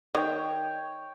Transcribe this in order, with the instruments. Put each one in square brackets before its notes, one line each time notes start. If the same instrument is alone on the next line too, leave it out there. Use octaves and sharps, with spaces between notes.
[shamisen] D#3 D#5 [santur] C#5 G5